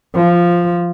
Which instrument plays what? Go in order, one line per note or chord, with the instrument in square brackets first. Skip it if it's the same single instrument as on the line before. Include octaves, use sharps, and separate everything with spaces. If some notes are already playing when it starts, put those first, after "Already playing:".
[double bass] F3